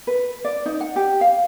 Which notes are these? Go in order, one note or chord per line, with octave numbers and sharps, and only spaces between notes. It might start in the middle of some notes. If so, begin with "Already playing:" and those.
B4
D5
D#4
F#5
G4
F5